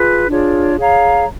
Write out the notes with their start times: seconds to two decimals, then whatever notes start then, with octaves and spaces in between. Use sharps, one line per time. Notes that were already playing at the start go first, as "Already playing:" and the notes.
Already playing: F4 G#4 B4
0.28 D4 F4 G#4 C#5
0.76 G#4 C#5 F5 A#5